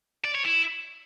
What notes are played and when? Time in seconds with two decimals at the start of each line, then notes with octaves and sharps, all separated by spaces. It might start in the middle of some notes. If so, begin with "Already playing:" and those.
0.25 D5
0.35 C#5
0.45 E4